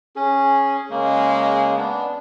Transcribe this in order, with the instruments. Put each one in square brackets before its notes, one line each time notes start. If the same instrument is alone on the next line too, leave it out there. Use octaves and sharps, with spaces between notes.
[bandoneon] C#4 [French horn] G#4
[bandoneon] C#3 A#3 [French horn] G#3
[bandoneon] B3 D4